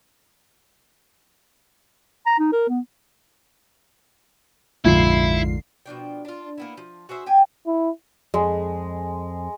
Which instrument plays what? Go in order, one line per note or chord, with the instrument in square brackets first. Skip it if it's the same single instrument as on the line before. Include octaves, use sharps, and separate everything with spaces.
[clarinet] A#5
D#4
A#4
B3
[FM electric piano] A#1 F2 C7 [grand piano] G#2 D3 F4 [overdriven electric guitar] E4
[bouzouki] B2 F3 D4 G5
D4 F4
A#3 B3 E4
F3
F#4 G#4 C5 E5
G4 G5 G#5
[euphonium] E4
[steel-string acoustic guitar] F2 [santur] G#3